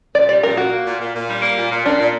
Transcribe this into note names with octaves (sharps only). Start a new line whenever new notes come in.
A#2 D5
G3 D5
A#2 A#4
A#3 F#4
A#3
A#2
A#2
A#2
G3
A#3
A#2
A#2
A#2 D4
A#2